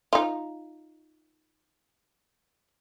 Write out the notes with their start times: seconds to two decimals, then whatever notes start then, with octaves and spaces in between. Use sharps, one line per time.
0.13 D#4 F4